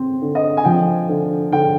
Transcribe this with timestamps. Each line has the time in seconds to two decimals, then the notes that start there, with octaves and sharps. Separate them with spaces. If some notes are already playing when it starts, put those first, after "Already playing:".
Already playing: C4
0.22 D3
0.35 D#5
0.57 G#5
0.65 F3 G5
1.09 D3
1.52 D3 G5